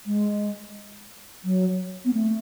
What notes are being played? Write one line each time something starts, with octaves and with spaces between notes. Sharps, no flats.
G#3
F#3
B3
A3